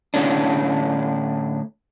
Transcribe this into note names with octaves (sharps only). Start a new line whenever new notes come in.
A2 D3 C#4 D4